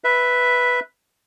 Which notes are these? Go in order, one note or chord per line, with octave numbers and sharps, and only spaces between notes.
B4 E5